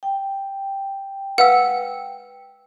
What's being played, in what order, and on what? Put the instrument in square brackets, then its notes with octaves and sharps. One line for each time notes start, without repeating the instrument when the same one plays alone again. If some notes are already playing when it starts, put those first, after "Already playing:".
[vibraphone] G5
[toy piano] B4 F5 E6 [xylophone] F#5